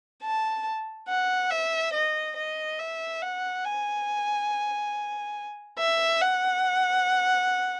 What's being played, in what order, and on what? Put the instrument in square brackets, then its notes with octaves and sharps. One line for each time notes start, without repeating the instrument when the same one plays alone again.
[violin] A5
F#5
E5
D#5
D#5
E5
F#5
G#5
E5
F#5